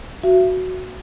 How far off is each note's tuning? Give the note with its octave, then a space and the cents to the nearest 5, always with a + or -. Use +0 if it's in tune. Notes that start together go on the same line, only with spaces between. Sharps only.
F#4 +0 E5 +35